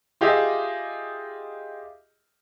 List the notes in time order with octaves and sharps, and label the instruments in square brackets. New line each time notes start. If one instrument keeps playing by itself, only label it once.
[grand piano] F4 G4 G#4 D#5 E5